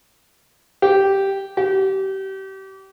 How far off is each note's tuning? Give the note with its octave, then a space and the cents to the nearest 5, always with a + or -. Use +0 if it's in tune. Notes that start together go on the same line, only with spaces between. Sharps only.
G4 -5
G4 -30